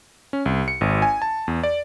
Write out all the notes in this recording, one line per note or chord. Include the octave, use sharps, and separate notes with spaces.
C#4
C2
C#7
G#1
G#5
A5
E2
D5